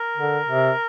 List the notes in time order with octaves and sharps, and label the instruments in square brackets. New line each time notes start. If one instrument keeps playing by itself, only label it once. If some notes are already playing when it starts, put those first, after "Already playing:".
Already playing: [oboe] A#4
[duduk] D3
C3